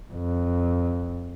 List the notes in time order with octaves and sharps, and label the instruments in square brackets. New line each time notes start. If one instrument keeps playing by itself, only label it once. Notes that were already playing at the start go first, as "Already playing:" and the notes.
[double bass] F2